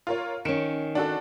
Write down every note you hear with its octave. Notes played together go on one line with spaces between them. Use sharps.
F4 A#4 C#5
D#3 C#4 C#7 D7 E7
D4 F#4 A4